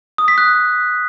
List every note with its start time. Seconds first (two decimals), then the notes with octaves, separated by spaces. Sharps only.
0.18 D#6
0.28 B6
0.38 F#6